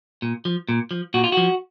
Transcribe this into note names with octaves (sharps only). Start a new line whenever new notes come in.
A#2
F3
A#2
F3
A#2 F#4
F4
F3 F#4